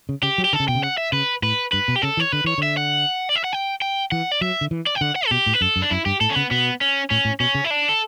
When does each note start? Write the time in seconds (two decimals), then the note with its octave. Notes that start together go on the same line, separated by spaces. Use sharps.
0.09 C#3
0.23 C#3 G4
0.38 F#3
0.44 G4
0.53 D3 A4
0.60 C#3
0.68 B2 G5
0.75 C#3
0.84 F#5
0.98 E5
1.12 C#3 B4
1.42 A2 B4
1.72 G2 B4
1.88 B2
1.96 G4
2.02 C#3 A4
2.17 E3
2.20 C#5
2.32 D3 B4
2.44 E3 C#5
2.58 D3 E5
2.77 F#5
3.29 D5
3.36 E5
3.44 F#5
3.52 G5
3.82 G5
4.12 E3 F#5
4.31 D5
4.41 F#3 E5
4.61 D3
4.71 E3
4.87 D5
4.95 G5
5.01 D3 F#5
5.16 F#5
5.26 A4
5.31 B2 G4
5.46 A2
5.54 B4
5.61 F#2 A4
5.76 F#2
5.82 D4
5.90 F#2 E4
6.05 G2 G4
6.21 A2 A4
6.30 C#4
6.35 C#3 B3
6.51 B2 B3
6.81 C#4
7.10 A2 C#4
7.25 A2
7.40 B2 C#4
7.55 C#3
7.64 E4
7.71 D4
7.89 A4